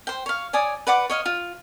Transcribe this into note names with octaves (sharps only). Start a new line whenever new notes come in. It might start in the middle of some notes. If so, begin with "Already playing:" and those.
C5 G5
C#5 F5
C#5 D5 G#5 D#6
B4 D5 F#5 D6
C#5 D#5 F5
F4